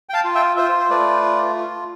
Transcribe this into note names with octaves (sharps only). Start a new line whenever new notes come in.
G5
F5 A5
F4
E5 G5
F4 C5 E5
C5
A3 B4 D5
F4
F4